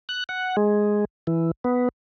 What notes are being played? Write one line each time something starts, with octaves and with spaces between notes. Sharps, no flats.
F#6
F#5
G#3
E3
B3